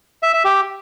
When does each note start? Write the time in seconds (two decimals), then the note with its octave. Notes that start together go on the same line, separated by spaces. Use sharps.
0.23 E5
0.34 E5
0.44 G4